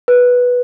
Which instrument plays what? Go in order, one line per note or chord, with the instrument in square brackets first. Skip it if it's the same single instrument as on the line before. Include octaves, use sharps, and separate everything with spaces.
[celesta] B4